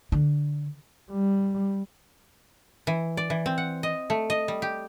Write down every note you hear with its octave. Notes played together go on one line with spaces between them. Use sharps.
D3
G3
E3
D5
E3
C4
F#5
D#5
A3
D#5
G3
G4